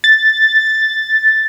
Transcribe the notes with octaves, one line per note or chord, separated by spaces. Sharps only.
A6